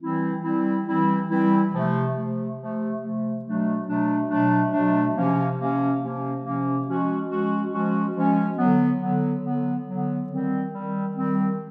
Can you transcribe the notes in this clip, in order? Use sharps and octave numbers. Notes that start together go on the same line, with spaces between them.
E3 G3 C4 E4
E3 G3 C4 E4
E3 G3 C4 E4
E3 G3 C4 E4
C3 F3 A3
C3 F3 A3
C3 F3 A3
C3 F3 A3
B2 F#3 A3 D4
B2 F#3 A3 D4
B2 F#3 A3 D4
B2 F#3 A3 D4
C3 F3 A#3 C#4
C3 F3 A#3 C#4
C3 F3 A#3 C#4
C3 F3 A#3 C#4
F3 G#3 C#4 F#4
F3 G#3 C#4 F#4
F3 G#3 C#4 F#4
F3 G#3 C#4 F#4
D3 F#3 B3
D3 F#3 B3
D3 F#3 B3
D3 F#3 B3
D#3 G3 C4
D#3 G3 C4
D#3 G3 C4